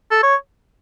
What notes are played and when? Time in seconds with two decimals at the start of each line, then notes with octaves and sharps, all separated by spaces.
0.11 A4
0.23 C#5